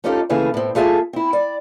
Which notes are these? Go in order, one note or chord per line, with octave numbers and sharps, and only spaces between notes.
A3 C#4 D#4 F4 G4 A4
D#2 C#3 E3 A3 G#4 F5
A2 C4
A3 F4 G#4 E5 A5
C4 E4
D5